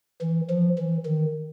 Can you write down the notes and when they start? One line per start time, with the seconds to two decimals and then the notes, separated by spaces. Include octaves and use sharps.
0.22 E3
0.50 F3
0.78 E3
1.06 D#3